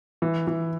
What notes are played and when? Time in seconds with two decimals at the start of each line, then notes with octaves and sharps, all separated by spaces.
0.22 E3
0.47 E3